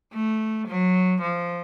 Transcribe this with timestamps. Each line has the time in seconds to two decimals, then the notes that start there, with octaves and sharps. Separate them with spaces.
0.13 A3
0.68 F#3
1.21 F3